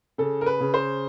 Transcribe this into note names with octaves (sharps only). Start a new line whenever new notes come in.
C#3 A4
A#4
B4
C#3
C5